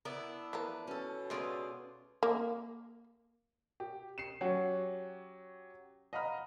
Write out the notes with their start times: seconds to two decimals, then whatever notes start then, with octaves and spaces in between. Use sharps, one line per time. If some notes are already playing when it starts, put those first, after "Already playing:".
0.05 B3 D4 E4 A#4
0.53 E3 F3 A#4 B4
0.87 B2 C#4 A4
1.30 G#3 B3 C#4 F4 G#4 D5 E5
2.23 A#3
3.80 G4
4.18 C7 C#7 E7
4.41 F#3 C#4 G4 F#5
6.13 D#5 F5 F#5 A#5 B5 F6